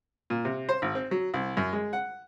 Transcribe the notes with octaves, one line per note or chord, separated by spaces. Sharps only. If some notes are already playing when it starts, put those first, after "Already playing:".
A#2
C3
C5
G#1
C4
F#3
C2
F#2
G#3
F#5